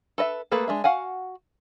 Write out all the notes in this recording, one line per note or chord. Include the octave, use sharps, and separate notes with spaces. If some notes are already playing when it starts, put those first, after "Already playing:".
A4 B4 D#5 E5
A3 A#3 G#4 A4 B4
G#3 D4 E5
F#4 F5 F#5 G#5